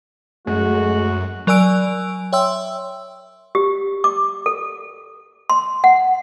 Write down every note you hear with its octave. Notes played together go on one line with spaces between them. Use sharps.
F#2 G#3 A3 F#4
F#3 A#4 D5 G#5 E6 D7
C#5 E5 G5 C6 E6
G4
D6
A4
C6
F#5